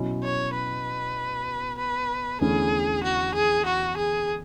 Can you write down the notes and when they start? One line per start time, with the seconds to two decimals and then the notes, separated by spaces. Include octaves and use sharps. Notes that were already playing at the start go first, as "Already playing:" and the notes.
Already playing: B2 F#3 C#4 E4
0.23 C#5
0.54 B4
1.78 B4
2.41 E2 D3 A3 C#4 E4 G#4
3.03 F#4
3.35 G#4
3.66 F#4
3.97 G#4